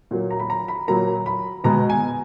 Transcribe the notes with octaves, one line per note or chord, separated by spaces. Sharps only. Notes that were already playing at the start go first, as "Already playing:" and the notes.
A#2 F#3 A#3
A#5
B5
A#5
B5
A#2 F#3 A#3 A#5
B5
B2 G#3 B3 A#5
G#5